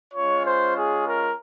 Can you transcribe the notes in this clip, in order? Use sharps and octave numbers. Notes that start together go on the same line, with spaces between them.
G#3 C#4 F4 C#5
C5
G#4
A#4